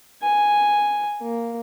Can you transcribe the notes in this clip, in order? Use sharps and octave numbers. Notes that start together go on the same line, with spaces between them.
G#5
A#3